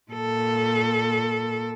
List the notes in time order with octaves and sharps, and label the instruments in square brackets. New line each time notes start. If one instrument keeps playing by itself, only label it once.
[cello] A#2 A4